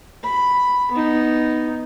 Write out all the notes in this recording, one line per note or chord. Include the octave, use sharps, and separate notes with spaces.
B5
B3 D#4